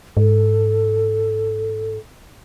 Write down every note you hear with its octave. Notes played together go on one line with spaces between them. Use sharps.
G#2 A4